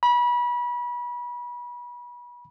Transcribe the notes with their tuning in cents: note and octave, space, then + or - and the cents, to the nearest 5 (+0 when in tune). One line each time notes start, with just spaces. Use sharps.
B5 -30